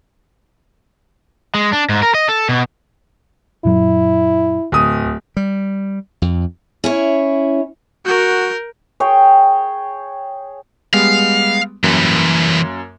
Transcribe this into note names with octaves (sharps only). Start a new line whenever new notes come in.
G#3
D4
G#2
A#4
D#5
A4
B2
F#2 A#2 F#3 E4
D1 D2 D#6
G3
F2
C#4 E4 C#5
F#4 A#4 G6
G#4 C#5 G5
G3 G#3 B3 F5
F#2 E3 G3 A#3